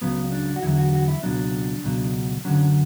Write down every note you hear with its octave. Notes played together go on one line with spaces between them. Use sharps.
C#2 C#3 F#3 B3
D4
F#4
E2 D3 F#3 E4
F#4
F#4
E4
C#2 B2 F#3 D4
C#2 B2 F#3
F#2 D3 F#3 C#4